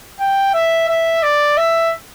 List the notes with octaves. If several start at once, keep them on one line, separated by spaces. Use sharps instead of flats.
G5
E5
E5
D5
E5